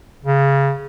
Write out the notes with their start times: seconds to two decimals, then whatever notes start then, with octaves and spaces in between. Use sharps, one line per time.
0.25 C#3